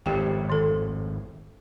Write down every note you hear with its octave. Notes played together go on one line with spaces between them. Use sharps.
G#1 F2 A2 G4 G5
D#3 A4